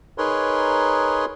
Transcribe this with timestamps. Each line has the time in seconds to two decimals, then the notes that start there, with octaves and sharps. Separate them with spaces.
0.18 D#4 G#4 A#4 B4 C#5 C6